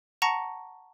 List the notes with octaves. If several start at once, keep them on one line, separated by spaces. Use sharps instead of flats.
F#5 A5 A#5 C#6 A#6 C#7